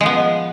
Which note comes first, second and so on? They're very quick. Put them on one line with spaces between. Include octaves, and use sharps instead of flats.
G#3 F3 B3